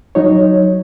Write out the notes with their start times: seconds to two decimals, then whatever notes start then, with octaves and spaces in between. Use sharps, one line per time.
0.15 F#3 D#4 C#5